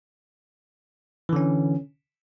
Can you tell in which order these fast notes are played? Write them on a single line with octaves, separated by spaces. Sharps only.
E3 D3 C#4